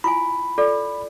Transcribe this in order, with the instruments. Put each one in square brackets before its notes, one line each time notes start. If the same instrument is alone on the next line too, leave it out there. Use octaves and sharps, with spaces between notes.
[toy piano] E4 F4 G#5 [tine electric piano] B5
[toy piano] F4 A4 D5